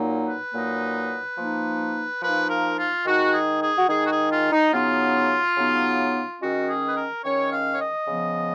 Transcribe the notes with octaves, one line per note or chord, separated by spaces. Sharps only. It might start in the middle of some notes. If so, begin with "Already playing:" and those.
Already playing: A#2 F#3 A#3 D#4
B4
A#2 F#3 A#3 D#4
F3 A#3 D#4
F3 A#3 D#4 B4
A#4
F4
D#3 G#3 D#4 F#4
G#4
G#4
F#4
D#3 G#3 D#4 G#4
F#4
G#4
F4
D#4
C#3 F#3 B3 D#4 F4
C#3 F#3 B3 D#4
D#3 G#3 C#4 F#4
G#4
B4
A#4
D#3 G#3 C#4 C#5
F5
C#5
D#5
C#3 F3 B3